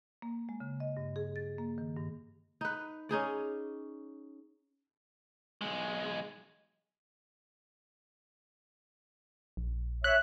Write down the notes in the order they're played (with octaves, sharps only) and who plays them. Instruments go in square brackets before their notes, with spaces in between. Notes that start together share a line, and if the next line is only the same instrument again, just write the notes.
[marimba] A#3
G#3
C#3
D#5
G2
G#4
A6
A#3
D#3
G2
[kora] D#4 B4
C#4 D#4 G#4 D5
[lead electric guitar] B1 G#3
[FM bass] A#1
[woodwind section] C#5 E5 [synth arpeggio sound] F#6